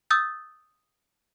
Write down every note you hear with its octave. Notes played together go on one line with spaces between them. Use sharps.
D#6 E6 G6 A6